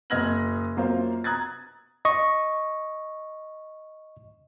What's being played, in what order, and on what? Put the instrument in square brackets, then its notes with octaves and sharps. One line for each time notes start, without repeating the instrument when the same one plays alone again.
[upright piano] F#1 D#5 F6 G#6 A#6 F#7
F#2 A#3 F4 C5 F5
A#5 D#6 F#6 G#6 A6
[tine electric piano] D#5 C#6